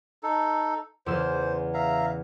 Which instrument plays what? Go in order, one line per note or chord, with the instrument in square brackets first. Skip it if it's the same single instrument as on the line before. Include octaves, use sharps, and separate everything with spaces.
[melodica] D#4 A4
[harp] E2 C#3 E6 [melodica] C5
[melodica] E5 F5 A#5